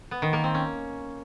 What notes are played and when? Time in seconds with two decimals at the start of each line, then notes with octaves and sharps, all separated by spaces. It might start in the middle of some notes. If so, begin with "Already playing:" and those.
0.11 B3
0.22 D#3
0.33 A#3
0.44 C4
0.54 C#4